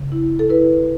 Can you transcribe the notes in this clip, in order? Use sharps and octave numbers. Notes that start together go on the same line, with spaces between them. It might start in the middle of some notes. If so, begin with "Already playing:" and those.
Already playing: C#3
E4
A4
E4 B4